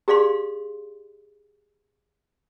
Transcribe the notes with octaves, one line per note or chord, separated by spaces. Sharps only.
G4 G#4 D5 F5 C6